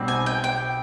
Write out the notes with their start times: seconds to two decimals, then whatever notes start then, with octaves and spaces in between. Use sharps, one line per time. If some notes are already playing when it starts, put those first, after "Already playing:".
Already playing: B1 B2 G3 C4
0.08 G#5
0.26 G5
0.44 G5